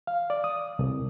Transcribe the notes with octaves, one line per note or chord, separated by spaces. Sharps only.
F5
D5
D#6
C2